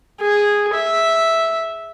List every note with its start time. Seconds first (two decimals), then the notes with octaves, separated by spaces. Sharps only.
0.20 G#4
0.74 E5